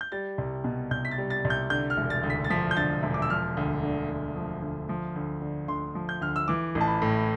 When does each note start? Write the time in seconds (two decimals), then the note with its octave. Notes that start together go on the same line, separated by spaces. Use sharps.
0.01 G6
0.12 G3 A6
0.38 C2
0.64 B2
0.91 C2 G6
1.05 B6
1.11 A6
1.18 G3
1.30 A6
1.45 C2
1.50 G6
1.70 D3 G6
1.90 F6
1.97 E1
2.10 A6
2.23 D2
2.30 B6
2.44 A6
2.50 F3 B6
2.71 G6
2.77 D3 A6
3.03 E1
3.14 D6
3.22 E6
3.30 F3 F6
3.57 D2
3.83 D3
4.10 D2
4.36 F3
4.62 D2
4.89 F3
5.16 D2
5.42 D3
5.68 D2 C6
5.95 F3
6.09 G6
6.21 D2 F6
6.36 E6
6.48 E3 D6
6.75 A1
6.81 A5
6.88 B5
7.02 A2